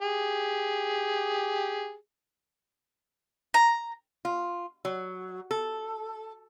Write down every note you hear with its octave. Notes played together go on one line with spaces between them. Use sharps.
G4 G#4
A#5
F4
F#3
A4